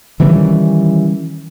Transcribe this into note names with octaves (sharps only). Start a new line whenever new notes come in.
D#3 E3 G3 C#4